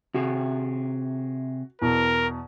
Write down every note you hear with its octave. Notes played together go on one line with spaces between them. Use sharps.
C3 F#4 G#4
E2 B2 A#4